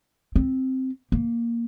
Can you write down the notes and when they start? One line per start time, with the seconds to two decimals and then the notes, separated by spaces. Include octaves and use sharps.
0.36 C4
1.12 A#3